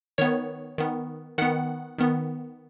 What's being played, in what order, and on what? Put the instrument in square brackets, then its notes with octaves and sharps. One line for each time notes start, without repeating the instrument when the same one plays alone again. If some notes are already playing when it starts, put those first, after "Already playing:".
[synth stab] D#3 B3 C#5
D#3 B3
D#3 B3 F#5
D#3 B3